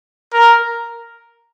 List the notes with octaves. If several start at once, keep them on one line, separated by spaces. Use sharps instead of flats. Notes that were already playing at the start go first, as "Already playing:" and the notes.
A#4